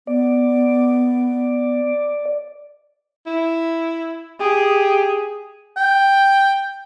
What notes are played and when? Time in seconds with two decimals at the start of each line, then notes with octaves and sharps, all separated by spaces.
0.07 B3 D5
3.27 E4
4.41 G4 G#4
5.77 G5